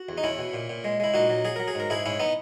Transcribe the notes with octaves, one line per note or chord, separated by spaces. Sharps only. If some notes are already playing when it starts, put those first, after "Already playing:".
Already playing: F#4
E2
D#4
E2 C#4 E4
B2
A#2
A#2
G#3
G#3 E4
A#2 D#4 F#4
F#3
F#3 G#4
F#3 A#4
G#4
G#2 A#4
G#2 E4 G#4
G#2 C#4 E4
B3 D#4